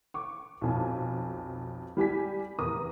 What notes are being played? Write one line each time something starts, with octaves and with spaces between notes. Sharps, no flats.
C#6 D6
B1 F2 G#5
G3 G4 G#5 B6
F1 E2 A#4 A#5 D#6